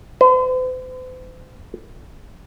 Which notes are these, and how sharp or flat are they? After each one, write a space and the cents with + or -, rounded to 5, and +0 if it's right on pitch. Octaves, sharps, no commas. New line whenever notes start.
C5 -45